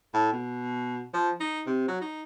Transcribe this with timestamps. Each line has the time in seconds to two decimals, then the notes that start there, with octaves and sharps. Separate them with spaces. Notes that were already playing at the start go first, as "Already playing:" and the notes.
0.14 A2
0.32 B2
1.14 F3
1.40 D#4
1.66 C3
1.88 F#3
2.01 D#4